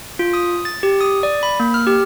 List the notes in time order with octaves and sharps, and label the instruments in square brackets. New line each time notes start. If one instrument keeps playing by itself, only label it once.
[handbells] F4
D#6
A6
G4
D#6
D5
B5
A#3
F6
G4